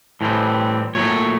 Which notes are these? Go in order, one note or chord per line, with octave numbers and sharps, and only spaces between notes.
A2 E3 G3 C4
A#2 F#3 A3 C#5